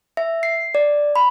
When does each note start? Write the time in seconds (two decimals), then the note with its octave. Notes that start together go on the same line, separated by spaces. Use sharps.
0.17 E5
0.43 C7
0.75 D5
1.16 B5